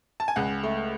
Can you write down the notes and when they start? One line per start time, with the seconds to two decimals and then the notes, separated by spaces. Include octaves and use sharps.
0.20 A5
0.28 G#5
0.36 C#2 F#5
0.63 A3